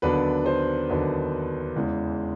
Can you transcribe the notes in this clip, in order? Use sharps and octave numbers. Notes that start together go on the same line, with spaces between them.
D#2 D3 F#3 B3 D4 B4
C5
D#2 D3 F#3 B3 D4
E2 C#3 E3 G#3